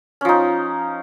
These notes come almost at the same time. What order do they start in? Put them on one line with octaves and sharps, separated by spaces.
C#4 F3 D#4